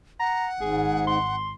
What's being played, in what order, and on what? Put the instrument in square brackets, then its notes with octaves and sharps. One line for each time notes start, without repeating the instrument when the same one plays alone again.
[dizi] F#5 [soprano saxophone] A#5
[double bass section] G#1 [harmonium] G#2 [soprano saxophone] G#4
[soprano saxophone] C6